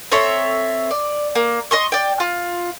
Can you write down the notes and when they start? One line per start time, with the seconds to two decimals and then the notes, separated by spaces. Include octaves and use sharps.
0.12 C4 A4 C#5 E5
0.91 D5
1.35 A#3
1.71 D#5 C6 C#6
1.92 D5 G5
2.20 F4